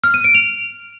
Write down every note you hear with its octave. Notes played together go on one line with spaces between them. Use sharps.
F6
D#7
D7
F7